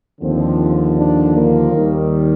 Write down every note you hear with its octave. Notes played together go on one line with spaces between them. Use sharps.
D#2 D3 F3 C4
D4
A#3
D#2 D#3 G3